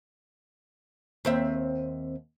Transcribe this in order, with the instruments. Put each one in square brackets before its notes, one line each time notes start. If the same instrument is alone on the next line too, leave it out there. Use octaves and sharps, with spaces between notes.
[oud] D#2 C4 E5